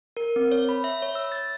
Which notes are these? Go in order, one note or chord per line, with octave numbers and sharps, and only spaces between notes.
A#4
C4
C#5
B5
E5
C#5
E6
A6